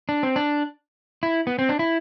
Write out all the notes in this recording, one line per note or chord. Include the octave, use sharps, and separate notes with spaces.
D4
C4
D4
E4
B3
C4
D4
E4